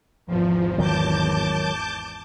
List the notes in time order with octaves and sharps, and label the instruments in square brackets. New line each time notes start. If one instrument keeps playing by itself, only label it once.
[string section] G#1 E2 [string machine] F3
[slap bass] D#3 F#3 [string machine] A5 D6 G6